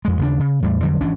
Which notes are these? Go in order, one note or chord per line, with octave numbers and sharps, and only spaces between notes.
F2 G#3
D#2 C#3 C4 D4
C#3
E2 A2 G3
F2 D3 F#3 G3
G#1 E3 C#4 D4